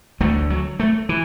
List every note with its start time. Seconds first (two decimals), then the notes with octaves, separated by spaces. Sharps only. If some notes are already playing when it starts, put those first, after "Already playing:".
0.20 D2 D3 A3
0.50 F#3
0.80 A3
1.09 E3